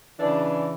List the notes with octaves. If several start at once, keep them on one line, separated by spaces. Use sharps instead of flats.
C#3 E3 D4